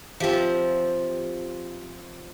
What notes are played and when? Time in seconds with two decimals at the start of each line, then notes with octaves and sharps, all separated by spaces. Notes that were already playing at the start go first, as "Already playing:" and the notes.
0.20 F3 C4 F4 G4 E5